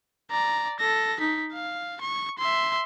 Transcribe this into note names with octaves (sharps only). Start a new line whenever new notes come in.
D5 A#5
A4 A#6
D#4 B6
F5
C#6
E5 C6